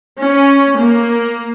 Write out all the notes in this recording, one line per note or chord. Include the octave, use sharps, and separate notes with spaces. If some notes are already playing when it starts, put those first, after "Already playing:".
C#4
A#3